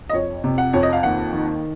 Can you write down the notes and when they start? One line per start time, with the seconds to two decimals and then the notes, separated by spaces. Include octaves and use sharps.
0.09 D#5
0.13 F2 C#5
0.44 C3
0.58 F#5
0.73 F2 C#5
0.83 D#5
0.93 F5
1.03 D#2 F#5
1.33 D#3